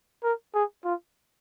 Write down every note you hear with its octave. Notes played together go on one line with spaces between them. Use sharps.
A#4
G#4
F4